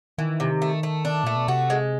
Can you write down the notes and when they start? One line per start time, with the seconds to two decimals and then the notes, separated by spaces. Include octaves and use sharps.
0.18 D#3 E3
0.40 C3
0.62 A3
0.83 A3
1.05 D4
1.24 A#2 A3
1.36 B2
1.48 C3 F#4
1.70 G#3